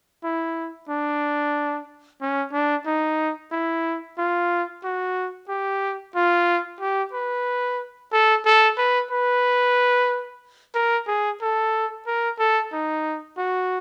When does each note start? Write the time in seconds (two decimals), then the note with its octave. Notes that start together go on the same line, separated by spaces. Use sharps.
0.24 E4
0.89 D4
2.21 C#4
2.53 D4
2.86 D#4
3.52 E4
4.18 F4
4.84 F#4
5.49 G4
6.15 F4
6.80 G4
7.13 B4
8.12 A4
8.46 A4
8.78 B4
9.11 B4
10.75 A#4
11.07 G#4
11.41 A4
12.07 A#4
12.39 A4
12.73 D#4
13.38 F#4